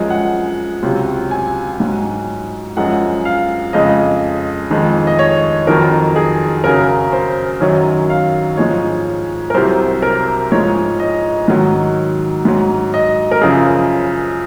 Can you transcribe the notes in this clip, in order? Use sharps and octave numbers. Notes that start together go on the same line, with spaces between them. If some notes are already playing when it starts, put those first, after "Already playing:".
Already playing: F#2 F3 G#3
F#5
C#2 C3 F#3
G#5
G#2 F#3
F#2 F3 G#3 F#5
F5
F2 C#3 G#3 D#5
F2 D#3 G#3
D#5
C#5
F2 D#3 F#3 A#4
G#4
F#2 C#3 F#3 A#4
C5
F#2 D#3 F#3 C#5
F5
G#2 F3 G#3 C#5
A#4
C2 C3 F#3 C5
A#4
G#2 F3 G#3 C#5
D#5
G#2 D#3 F#3
G#2 F#3
D#5
A#4
F#2 C#3 F3 G#4